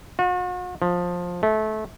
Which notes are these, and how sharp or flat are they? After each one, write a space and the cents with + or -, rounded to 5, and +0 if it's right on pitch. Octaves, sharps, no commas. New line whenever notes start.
F#4 -45
F3 +15
A3 -25